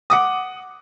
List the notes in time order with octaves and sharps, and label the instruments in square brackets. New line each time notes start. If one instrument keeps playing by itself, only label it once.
[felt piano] F#5 D6 D#6